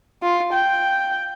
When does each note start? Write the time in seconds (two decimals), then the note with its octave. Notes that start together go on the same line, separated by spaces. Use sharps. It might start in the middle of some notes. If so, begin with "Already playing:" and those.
0.22 F4
0.52 G5